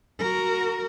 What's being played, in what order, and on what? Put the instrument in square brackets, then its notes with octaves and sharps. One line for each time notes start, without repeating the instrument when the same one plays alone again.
[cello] F#4 A#4